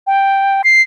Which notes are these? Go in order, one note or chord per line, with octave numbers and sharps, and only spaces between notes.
G5
C7